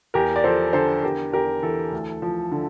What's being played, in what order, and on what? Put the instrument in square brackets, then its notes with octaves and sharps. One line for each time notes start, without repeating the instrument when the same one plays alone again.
[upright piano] E2 G4 A#4
D5
F3 A4 C5
D3 A4 C5
E2 G4 A#4
E2 G4 A#4
E3 A4
D2
F3
D3